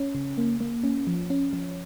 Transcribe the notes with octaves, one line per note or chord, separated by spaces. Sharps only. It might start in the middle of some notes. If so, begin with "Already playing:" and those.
Already playing: C#4
C#3
A#3
A#3
C#4
F3
C#4
F3